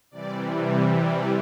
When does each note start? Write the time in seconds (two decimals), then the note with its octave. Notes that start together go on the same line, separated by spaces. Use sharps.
0.11 C3 E3 G3 D5
0.72 E5
1.01 D5